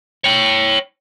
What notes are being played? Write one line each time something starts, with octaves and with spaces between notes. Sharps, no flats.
C#5 G5